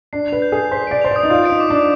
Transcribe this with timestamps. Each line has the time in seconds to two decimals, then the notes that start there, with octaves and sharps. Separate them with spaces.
0.13 D4 C7
0.28 B4 F7
0.42 G6
0.52 G#4
0.58 G6
0.71 C5 B6
0.87 D5 D7
1.01 C5 F7
1.11 D5 D#6
1.23 D#4
1.30 F4 G6
1.46 D#4 D7
1.60 D6
1.70 D4 D6